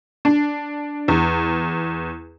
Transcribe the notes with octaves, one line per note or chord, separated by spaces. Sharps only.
D4
E2